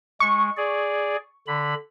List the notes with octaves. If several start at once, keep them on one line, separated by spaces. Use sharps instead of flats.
G#3 C#6
G#4 D5
D3 B5